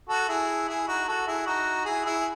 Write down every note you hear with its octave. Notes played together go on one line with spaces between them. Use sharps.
F#4 A4
E4 G#4
E4 G#4
D#4 F#4
F#4 A4
E4 G#4
D#4 F#4
E4 G#4
E4 G#4